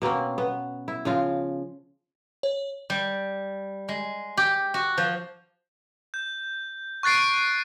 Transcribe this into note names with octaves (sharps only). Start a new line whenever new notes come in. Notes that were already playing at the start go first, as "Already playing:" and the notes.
B2 A#3 C4 C#4
B3
E4
C#3 F3 F4
C#5
G3
G#3
G4
F#4
F3
G6
C#6 F#6 A6 C7 D7